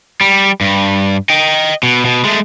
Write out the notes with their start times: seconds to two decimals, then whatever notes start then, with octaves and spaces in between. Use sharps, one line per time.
0.21 G3
0.61 G2
1.30 D#5 G5
1.83 B2
2.05 B2
2.25 G#3 A3